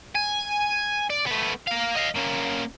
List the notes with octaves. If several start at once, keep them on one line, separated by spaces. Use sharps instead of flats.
G#5
D5
A3 B3
A#4 F5
D#5 F5
A#3 C#4